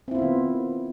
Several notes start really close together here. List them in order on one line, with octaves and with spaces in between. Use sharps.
C4 E4 F4 B3 D#3